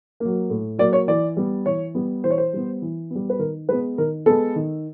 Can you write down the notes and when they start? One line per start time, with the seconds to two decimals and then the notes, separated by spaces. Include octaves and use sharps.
0.20 F#3 A#3
0.50 A2
0.78 F#3 A#3 D5
0.93 C#5
1.08 E3 D5
1.37 G3 B3
1.66 E3 C#5
1.95 G3 B3
2.24 E3 C5
2.30 C#5
2.38 C5
2.53 G3 B3
2.82 E3
3.11 G3 B3
3.30 B4
3.39 D#3 A#4
3.69 G#3 B3 B4
3.98 D#3 A#4
4.26 G#3 B3 A4
4.56 D#3